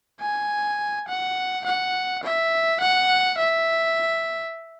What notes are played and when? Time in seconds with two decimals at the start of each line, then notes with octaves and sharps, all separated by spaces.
0.21 G#5
1.08 F#5
1.65 F#5
2.24 E5
2.81 F#5
3.38 E5